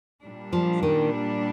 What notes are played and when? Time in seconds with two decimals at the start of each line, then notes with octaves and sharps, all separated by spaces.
0.22 A#2 G3 D4
0.53 F3
0.83 D#3